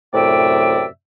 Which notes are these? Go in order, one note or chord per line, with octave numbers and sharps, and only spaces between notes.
F#2 A2 C3 D5 E5 G5